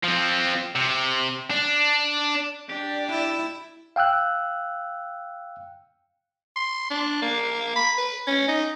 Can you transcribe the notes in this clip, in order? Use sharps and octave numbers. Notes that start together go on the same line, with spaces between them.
F3 C4
C3
D4
D4 G4 D5
E4
F5 G5 E6 F#6
C6
D4
A#3
B5
B4
C#4
D#4